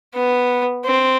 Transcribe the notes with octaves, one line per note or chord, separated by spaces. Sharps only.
B3
C4